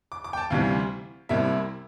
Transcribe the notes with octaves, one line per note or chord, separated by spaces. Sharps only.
D6
D6
G5
A5
D2 C3 E3 G3 F5
C2 C3 G3 A#3 E4 E5